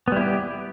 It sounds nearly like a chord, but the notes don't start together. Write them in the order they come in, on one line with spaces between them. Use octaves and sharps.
B3 G3 E4 G4